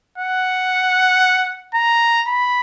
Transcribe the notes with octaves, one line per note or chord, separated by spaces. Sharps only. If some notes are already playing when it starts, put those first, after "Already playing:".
F#5
A#5
B5